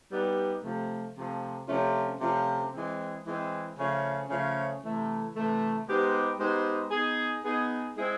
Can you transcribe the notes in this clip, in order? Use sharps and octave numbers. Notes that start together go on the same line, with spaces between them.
G3 B3 D#4 G4
C3 F3 A3
C3 F3 A3
C3 F3 A3 C#4 F4
C3 F3 A3 C#4 F4
E3 G#3 C4
E3 G#3 C4
C#3 F3 A3 C#4
C#3 F3 A3 C#4
C3 E3 A3
C3 E3 A3
G#3 B3 D#4 G4 C5
G#3 B3 D#4 G4 C5
B3 D#4 G#4
B3 D#4 G#4
G#3 C4 E4 G#4